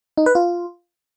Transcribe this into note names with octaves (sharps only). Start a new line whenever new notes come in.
D#4
B4
F4